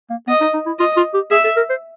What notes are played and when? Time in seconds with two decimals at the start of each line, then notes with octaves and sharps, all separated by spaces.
0.10 A#3
0.28 B3 D#5
0.41 D#4
0.54 D#4
0.66 E4
0.79 F4 D#5
0.97 F4
1.14 G4
1.31 G#4 E5
1.44 A4
1.57 A#4
1.70 C5